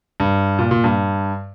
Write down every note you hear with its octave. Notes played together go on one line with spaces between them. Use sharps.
G2
A#2
A#2
G2